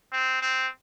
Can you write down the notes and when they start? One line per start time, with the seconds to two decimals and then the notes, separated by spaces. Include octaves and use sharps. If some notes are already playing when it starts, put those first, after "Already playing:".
0.13 C4
0.42 C4